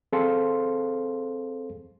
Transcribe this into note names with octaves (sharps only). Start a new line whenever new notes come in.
C4 G#4 A4 C5 F5 C6